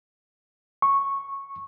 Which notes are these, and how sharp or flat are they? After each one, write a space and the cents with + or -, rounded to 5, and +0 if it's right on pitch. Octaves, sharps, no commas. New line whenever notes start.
C#6 -10